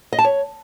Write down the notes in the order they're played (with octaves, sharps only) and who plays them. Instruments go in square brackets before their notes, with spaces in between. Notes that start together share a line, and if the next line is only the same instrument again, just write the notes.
[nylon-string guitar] D#5
A5
C#5